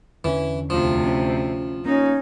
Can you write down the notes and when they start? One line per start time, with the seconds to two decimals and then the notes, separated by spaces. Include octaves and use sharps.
0.24 E2 D3 E3 C#4
0.70 D2 C3 F3
1.05 C#4
1.85 A#3 C#4 D#4